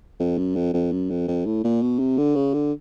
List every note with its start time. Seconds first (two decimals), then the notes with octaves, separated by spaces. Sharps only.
0.20 F2
0.38 F#2
0.56 F2
0.74 F2
0.92 F#2
1.10 F2
1.28 F2
1.46 A2
1.64 A#2
1.82 B2
1.99 C3
2.18 D3
2.36 C#3
2.54 D3